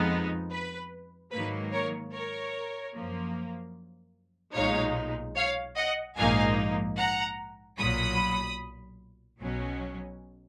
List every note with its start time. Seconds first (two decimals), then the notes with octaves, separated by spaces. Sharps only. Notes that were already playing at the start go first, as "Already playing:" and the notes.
Already playing: F2 F3 G#3 B3 D#4
0.52 B4
1.32 G#2 D#3 F#3 A#3 B4
1.72 A#4 C#5
2.13 A#4 C#5
2.94 F#2 F3 A#3
4.55 B1 A#2 G#3 D#4 C#5 F5
5.36 C#5 F5
5.76 D#5 F#5
6.17 A#1 G#2 F3 A#3 D#4 F5 G#5
6.98 F#5 A#5
7.78 B1 A#2 F#3 B5 D#6
9.40 B1 B2 F#3 C#4